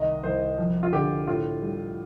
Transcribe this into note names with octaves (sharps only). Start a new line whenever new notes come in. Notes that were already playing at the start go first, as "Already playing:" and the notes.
Already playing: C2 D#3 D#5
C2 C5
F3
F4
D3 G4
A2 F4
G3